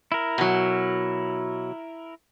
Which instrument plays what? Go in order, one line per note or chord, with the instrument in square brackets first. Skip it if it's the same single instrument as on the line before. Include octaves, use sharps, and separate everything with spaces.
[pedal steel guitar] E4 A#4
[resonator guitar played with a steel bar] B2 F#3